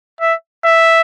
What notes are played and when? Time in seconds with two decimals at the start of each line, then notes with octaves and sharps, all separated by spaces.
0.21 E5
0.64 E5